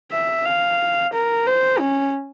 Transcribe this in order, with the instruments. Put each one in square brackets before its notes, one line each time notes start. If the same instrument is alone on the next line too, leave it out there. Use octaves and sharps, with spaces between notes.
[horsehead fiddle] E5
F5
A#4
C5
C#4